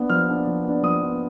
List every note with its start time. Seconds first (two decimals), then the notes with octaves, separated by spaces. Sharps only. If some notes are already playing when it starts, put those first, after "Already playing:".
Already playing: B3 D4
0.10 F3 F6
0.28 B3 D4
0.47 F3
0.64 B3 D4
0.83 F3 D#6
1.02 B3 D4